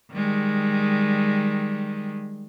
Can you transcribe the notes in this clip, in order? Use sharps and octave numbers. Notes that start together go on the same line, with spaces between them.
D#3 G3 G#3